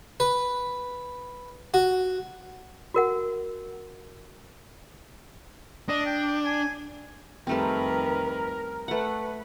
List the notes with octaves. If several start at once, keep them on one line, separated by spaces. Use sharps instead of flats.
B4
F#4
F#4 A#4 F#5
D4 D#5
G5
G#5
F2 D#3 G3 A3 C4 A#4 B4
A3 B4 F#5 B5